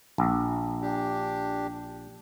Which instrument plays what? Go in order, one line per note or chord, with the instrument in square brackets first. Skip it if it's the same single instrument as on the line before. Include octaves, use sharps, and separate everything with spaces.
[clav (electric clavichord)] A#1
[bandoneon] D4 G4